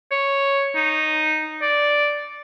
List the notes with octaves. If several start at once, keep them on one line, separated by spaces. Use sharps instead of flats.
C#5
D#4
D5